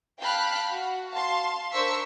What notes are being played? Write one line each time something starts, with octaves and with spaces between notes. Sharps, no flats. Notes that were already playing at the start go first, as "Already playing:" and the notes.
F5 G5 A5 B5 F6 F#6
F#4
F5 A5 C6
D4 A#4 C5 C#6 E6 B6